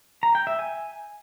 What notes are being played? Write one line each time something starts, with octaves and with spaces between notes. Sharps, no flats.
A#5
G5
E5
G#5